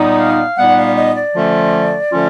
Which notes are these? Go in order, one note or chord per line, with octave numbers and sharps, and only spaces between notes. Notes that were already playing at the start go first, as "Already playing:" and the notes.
Already playing: A#2 G3 B3 D#4
F5
A#2 G3 B3 D#4 F#5
F5
D#5
D5
D3 F3 A3 C#4 F4
D3 F3 A3 C#4 F4